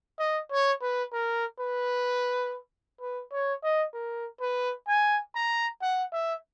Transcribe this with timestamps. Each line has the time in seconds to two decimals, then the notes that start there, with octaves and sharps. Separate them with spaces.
0.19 D#5
0.51 C#5
0.82 B4
1.13 A#4
1.59 B4
3.01 B4
3.32 C#5
3.63 D#5
3.94 A#4
4.41 B4
4.88 G#5
5.35 A#5
5.82 F#5
6.13 E5